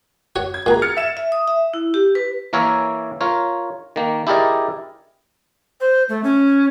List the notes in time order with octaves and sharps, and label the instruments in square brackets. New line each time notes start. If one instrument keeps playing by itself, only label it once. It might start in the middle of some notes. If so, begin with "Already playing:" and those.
[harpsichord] F#4 C#5
[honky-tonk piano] G#6
[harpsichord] A#2 F#4 [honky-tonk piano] G#4 A#5
[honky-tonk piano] F6 A6 C#7
E5 E7
[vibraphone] E5
D#6
E5
E4
G4
B4
[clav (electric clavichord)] E3 A#3 A#4 C#5 E5 G#5
F4 A#4 C#5
D#3 A#3
E4 G4 G#4 A#4 D5 D#5
[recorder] C5
A3
C#4